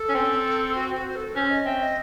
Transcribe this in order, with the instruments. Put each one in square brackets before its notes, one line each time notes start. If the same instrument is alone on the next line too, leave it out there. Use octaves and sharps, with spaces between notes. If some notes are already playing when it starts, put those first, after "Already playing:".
Already playing: [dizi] A4
[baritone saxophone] C#4
C4
[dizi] F#4
F#4
C5
A4
[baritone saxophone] C#4 [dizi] C5
[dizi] D#5
[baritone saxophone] C4 [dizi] E5
[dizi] D#5